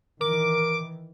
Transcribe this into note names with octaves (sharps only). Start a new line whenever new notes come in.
D#3 E3 A#4 D6